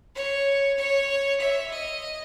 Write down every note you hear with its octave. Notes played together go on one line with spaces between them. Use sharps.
C#5
C#5
E5
D#5